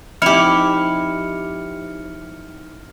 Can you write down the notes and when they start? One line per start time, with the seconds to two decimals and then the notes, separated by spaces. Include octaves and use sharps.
0.22 F3 C4 D#4 E4 G4 F6 C#7 F7